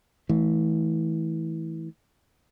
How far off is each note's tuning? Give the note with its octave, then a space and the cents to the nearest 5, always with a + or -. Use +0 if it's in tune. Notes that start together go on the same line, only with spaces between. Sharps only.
E3 -25 A3 -20